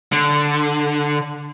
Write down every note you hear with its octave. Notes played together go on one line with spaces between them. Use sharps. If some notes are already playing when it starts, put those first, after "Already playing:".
D3